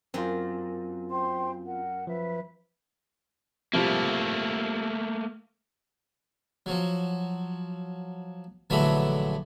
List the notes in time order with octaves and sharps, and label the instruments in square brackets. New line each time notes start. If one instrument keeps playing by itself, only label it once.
[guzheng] F#2 [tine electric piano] C4 F4
[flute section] C5 G5 C6
A#4 F#5
[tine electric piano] F3 [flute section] B4 E5
[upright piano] C3 F3 G3 [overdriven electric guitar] A3 A#3
[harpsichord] F3 F#3
A#1 D3 E3 F#3 A3 B5